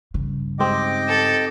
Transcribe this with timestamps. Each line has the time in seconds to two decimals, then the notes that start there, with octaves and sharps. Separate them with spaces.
0.14 G2 C#3
0.59 G#2 C4 G4 D#5 G5 D6
1.08 A4